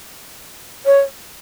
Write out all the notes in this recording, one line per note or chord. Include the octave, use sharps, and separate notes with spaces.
C#5